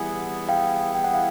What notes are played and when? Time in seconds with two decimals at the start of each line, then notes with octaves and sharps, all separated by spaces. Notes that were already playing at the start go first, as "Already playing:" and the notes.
Already playing: E3 G3 B3 E4 G#4 F#5 G#5
0.49 F5 G5
0.95 G5
1.04 F#5
1.14 F5